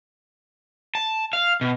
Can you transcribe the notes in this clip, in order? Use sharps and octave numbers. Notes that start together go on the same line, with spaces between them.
A5
F5
B2